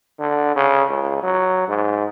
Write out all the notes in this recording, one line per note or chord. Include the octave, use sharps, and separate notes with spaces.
D3
C#3
C#2
F#3
G#2